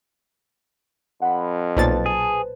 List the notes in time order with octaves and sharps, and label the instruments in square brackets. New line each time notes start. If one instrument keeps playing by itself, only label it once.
[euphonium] F2 [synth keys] F#5 B5
[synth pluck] B1 A#2 A6 [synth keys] B4 C5 A5
[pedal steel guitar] G#4